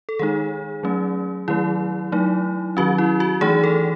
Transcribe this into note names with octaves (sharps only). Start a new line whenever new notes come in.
A4
D#3 G#3 D#4 G#4
F#3 A3 C#4
D#3 F#3 A3 E4
F#3 A3 D#4
D#3 F#3 C#4 F#4
E4
F#4
E3 A3 D#4 G#4
A4